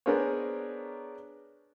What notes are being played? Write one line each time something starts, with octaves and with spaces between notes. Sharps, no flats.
B3 D4 G#4 A#4 C5 C#5